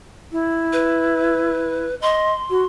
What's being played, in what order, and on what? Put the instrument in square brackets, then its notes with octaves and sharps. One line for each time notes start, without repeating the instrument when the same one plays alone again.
[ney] E4
[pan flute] B4
[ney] D#5 [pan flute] C6
[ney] F#4